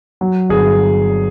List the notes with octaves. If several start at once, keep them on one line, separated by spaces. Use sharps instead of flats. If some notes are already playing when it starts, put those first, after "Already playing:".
F#3
G1 G#4